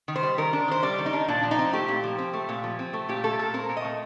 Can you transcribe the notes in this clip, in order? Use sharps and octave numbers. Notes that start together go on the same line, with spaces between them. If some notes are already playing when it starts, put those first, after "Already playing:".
D#3
C5
G3
D#3 A#4
D4
D#3 C5
G3 D5
D#3
D#4
D4
A#2 D4
F3
D#4
C4
A3 G4
A#2
F3
C4
A3
A#2
F3
C4
A3
A#2 G4
A3 A4
A#2 A4
C4 A#4
A#2
D#5
A3